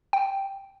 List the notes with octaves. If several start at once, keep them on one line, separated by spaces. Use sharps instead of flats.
G5